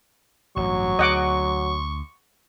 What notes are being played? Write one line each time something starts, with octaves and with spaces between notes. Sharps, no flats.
A1 G2 F#3 C#6
D2 D#5 F#5 D6